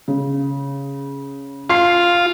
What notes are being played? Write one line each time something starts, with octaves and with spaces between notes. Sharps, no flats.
C#3
F4 C6 C7